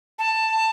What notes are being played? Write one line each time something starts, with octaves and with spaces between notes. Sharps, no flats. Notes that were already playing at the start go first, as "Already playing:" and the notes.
A5